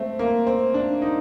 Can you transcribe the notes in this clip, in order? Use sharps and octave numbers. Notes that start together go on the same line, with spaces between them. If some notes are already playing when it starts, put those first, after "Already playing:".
Already playing: A3 C4
A#3
C4
D4
D#4